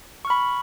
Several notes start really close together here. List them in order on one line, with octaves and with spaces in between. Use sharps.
C#6 F6 B5